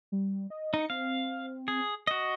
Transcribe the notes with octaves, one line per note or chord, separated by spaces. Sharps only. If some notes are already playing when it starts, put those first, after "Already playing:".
G3
D#5
D#4 C#7
C4 F5
G#4
F#4 D#5